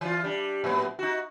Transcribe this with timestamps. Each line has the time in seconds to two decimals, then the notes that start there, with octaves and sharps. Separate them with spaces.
0.01 E3 F4
0.24 G3 D4
0.64 A2 F#3 B3
0.99 D#4 F#4